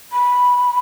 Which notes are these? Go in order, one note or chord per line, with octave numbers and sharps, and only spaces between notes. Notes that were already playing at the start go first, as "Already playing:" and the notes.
B5